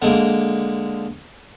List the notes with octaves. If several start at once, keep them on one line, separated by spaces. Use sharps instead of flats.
D3 G#3 A#3